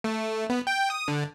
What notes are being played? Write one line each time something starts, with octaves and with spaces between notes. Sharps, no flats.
A3
B3
G5
D#6
D3